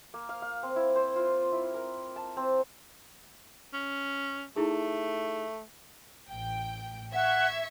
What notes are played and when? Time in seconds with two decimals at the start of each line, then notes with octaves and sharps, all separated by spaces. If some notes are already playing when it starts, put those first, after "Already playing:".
0.14 A#3
0.29 F5
0.42 F5
0.63 C4
0.76 E4
0.95 C5
1.16 F4
1.52 E4
1.74 A#4
2.16 A5
2.37 C4
3.74 C#4
4.56 A3 D#4 E4 G#4
6.29 A1 G5
7.14 E5 F#5 C#6 G#6